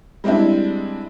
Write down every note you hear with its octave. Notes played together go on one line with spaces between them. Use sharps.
G3 G#3 C4 D4 E4